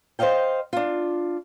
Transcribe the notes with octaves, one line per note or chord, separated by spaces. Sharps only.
C5 D5 D#5 F5 G5
D4 F4